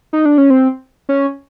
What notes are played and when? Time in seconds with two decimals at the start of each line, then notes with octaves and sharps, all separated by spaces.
0.13 D#4
0.25 D4
0.38 C#4
0.50 C4
1.09 C#4